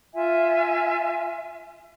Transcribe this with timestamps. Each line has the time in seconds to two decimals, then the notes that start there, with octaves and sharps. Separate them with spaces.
0.13 F4 E5 G#5